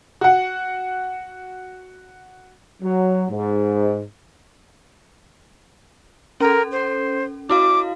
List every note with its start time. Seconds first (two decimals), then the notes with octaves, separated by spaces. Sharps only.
0.21 F#4 F#5
2.83 F#3
3.30 G#2
6.40 C#4 A4 A#4
6.72 C5
7.50 E4 F#4 F5 D6